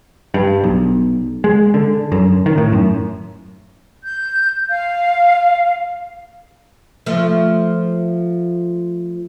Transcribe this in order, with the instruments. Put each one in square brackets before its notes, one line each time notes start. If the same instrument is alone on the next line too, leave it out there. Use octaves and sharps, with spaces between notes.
[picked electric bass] G2
B1
G#3
D3
F#2
D#3
A2
F#2
[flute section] G6
F5
[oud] F3 A3